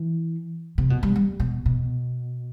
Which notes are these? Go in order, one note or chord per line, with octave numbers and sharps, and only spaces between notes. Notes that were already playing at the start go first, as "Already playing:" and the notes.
Already playing: E3
C3
B2
G3
G3
B2
B2